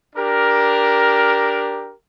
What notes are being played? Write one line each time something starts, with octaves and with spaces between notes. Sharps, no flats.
D4 G4 A#4